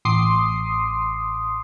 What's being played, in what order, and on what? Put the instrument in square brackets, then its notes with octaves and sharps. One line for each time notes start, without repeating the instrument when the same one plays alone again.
[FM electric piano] A1 C6 D6 D#6 C7